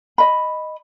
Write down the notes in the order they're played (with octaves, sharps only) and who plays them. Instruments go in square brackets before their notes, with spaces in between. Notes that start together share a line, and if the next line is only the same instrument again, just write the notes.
[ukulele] D#5 B5